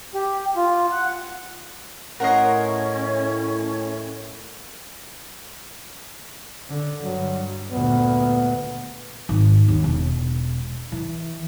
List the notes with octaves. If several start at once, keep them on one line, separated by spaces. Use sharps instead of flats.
G4
F4
F#5
A2 C#4 A#4 D#5 F#5 A#5 C6
D3
G2 F#3
D2 A#2 B3
G#1
D#2
E1
E3